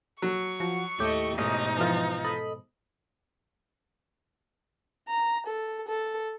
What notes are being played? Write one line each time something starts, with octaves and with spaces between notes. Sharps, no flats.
F#3 C#6
F3 F#4
D#2 A2 A3 G4 D#5
A1 G#2 B2 D#4 D#5
E3 F3
A4 D#5 B5
A#5
A4
A4